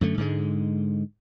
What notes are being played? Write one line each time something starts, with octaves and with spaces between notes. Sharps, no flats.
F#2 D3 A3
G#2 D3 G#3